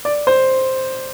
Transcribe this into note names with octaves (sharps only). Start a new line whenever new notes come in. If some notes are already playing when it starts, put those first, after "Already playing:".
D5
C5